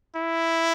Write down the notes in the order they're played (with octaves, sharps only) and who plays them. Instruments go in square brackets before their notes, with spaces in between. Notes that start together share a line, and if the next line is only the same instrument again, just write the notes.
[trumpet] E4